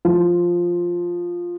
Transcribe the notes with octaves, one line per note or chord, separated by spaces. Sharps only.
F3